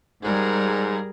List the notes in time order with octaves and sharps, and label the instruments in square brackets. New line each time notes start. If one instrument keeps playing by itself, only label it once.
[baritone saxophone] G#2 [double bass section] G3 [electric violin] G#4 A#4